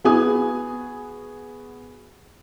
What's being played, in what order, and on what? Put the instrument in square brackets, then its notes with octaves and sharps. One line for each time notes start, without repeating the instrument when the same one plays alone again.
[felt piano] B3 F#4 G#4 G#5 D#6